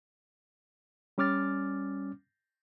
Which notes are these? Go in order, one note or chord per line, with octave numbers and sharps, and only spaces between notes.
G3 C#4 D6 F6 A6